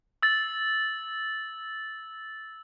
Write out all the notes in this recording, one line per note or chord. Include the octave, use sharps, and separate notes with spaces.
E6 A6